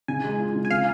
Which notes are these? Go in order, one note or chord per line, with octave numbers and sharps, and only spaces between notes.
C#3 G#5
G#3
F4
C#3
G#5
C#3 F5